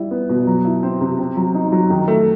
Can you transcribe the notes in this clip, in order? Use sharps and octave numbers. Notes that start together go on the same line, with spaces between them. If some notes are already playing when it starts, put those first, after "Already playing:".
Already playing: G3 E4
B3
B2
F#3
E4
C4
C3
C4
F#3
D#4
F#3
D#3
A3